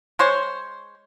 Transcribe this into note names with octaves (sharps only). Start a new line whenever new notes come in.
G#3 C5 C#5